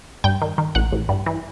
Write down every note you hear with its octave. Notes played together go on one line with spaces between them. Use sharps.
G2 G5
D#3
D#3
A1 F#5
A1
G2
E3